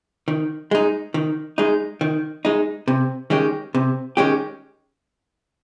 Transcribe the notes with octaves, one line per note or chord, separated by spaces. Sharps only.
D#3
G#3 D#4
D#3
G#3 D#4
D#3
G#3 D#4
C3
D#3 G#3 C#4 G4
C3
D#3 G#3 C#4 G4